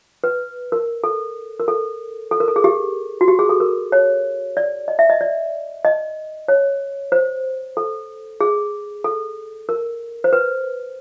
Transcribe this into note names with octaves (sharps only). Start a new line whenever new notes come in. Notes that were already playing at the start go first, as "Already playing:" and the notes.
B4
A#4
A4
A#4
A4
A4
A#4
A4
G#4
G4
F#4
G4
G#4
A4
A#4
C#5
D5
D#5
E5
D#5
D5
D#5
C#5
C5
A4
G#4
A4
A#4
C5
B4